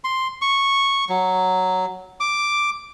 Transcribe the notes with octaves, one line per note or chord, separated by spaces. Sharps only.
C6
C#6
F#3
D6